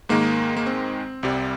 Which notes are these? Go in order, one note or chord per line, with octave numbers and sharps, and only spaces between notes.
G#2 D#3 G#3 A#3
A#3
C4
C2 C3 G3